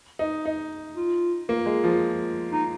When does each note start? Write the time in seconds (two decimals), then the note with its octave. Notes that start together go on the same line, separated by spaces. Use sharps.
0.19 D#4
0.45 D#4
0.97 F4
1.49 A#3 F4
1.66 G#3
1.84 F3
2.52 D#4